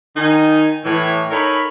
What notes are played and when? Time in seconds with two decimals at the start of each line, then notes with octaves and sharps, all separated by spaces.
0.17 D#3 D#4 G#5
0.85 A2 E3 C#5
1.31 D#4 A4 A#4 C#5 G#5 B5